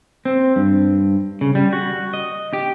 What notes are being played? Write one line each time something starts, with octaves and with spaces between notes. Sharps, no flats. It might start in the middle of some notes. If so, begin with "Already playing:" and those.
C4
G2
C#3
G3
F#4
D#5
G4